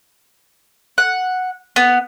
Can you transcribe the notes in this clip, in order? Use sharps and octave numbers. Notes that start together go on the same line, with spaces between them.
F#5
B3